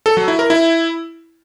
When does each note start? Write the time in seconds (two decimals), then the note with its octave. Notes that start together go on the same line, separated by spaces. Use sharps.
0.06 A4
0.17 F#3
0.28 E4
0.39 A#4
0.50 E4